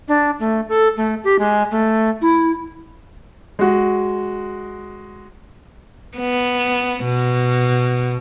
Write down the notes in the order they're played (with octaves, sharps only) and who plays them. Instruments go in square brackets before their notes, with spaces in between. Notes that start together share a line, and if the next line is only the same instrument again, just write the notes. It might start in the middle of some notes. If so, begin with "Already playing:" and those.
[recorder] D4
A3
A4
A3
G4
G#3
A3
E4
[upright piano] G#3 F#4
[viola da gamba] B3
B2